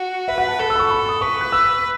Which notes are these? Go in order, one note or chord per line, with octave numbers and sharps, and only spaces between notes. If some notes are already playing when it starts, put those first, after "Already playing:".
Already playing: F#4
B4 E5
F#5
A5
A4 F#6
E6
B5
C#6
B5
D#6
B4 C#6
F#6
E6